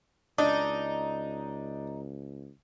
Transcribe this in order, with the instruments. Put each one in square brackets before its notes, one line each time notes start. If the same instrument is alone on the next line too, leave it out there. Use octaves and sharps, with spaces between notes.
[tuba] C#2 [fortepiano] D4 [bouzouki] D#4